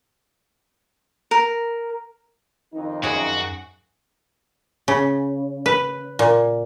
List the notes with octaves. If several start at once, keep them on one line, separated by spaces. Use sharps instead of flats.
A#4
F2 D#3 D#4
F#2 F#4 G#4 D7
C#3
B4
A#2